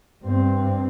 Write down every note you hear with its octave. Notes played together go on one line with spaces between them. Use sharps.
G2 C4